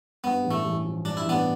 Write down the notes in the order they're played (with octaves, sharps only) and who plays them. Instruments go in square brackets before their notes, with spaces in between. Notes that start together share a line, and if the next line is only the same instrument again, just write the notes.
[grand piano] G2 [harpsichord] B3
[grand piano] A1
[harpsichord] A3
[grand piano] A1
F3
[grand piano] G2 [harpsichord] D4
[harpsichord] E4
[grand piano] A1 [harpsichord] B3 D4